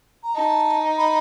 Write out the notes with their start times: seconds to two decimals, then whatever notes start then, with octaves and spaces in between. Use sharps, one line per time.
0.23 A#5
0.35 D#4 A5
0.97 B5